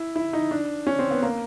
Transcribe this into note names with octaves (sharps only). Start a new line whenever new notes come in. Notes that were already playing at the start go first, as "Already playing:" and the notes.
Already playing: E4
E4
D#4
D4
C#4
C4
B3
A#3